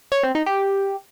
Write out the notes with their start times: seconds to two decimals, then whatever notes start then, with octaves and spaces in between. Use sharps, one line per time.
0.12 C#5
0.23 C4
0.35 D#4
0.46 G4